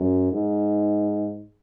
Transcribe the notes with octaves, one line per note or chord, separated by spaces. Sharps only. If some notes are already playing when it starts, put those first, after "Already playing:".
Already playing: F#2
G#2